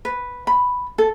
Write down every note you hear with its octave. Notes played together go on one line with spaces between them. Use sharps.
B4
B5
A4